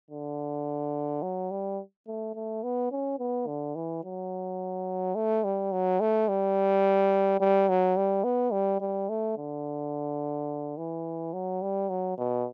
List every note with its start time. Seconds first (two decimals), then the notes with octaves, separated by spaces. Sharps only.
0.11 D3
1.22 F#3
1.51 G3
2.07 A3
2.35 A3
2.63 B3
2.91 C#4
3.19 B3
3.47 D3
3.76 E3
4.04 F#3
5.15 A3
5.44 G3
5.72 F#3
6.00 A3
6.28 G3
7.40 G3
7.69 F#3
7.97 G3
8.24 B3
8.52 G3
8.80 G3
9.09 A3
9.37 D3
10.77 E3
11.33 F#3
11.62 G3
11.89 F#3
12.18 B2